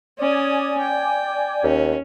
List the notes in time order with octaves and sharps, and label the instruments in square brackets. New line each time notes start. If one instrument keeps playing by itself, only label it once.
[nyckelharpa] C#4 D#6 [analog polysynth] D5 G#5
[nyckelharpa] G5
[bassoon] D#2 [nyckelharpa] C#4